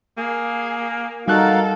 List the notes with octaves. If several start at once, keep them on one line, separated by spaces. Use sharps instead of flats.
A#3 G#4
G3 D#4 F#4 A4 A#4 F5 F#6